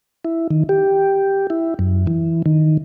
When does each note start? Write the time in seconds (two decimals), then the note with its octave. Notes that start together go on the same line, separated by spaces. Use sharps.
0.25 E4
0.51 D#3
0.69 G4
1.50 E4
1.79 F#2
2.07 E3
2.46 D#3